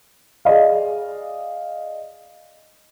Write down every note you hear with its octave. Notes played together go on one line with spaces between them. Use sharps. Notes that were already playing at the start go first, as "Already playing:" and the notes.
G#4 D5 D#5 F5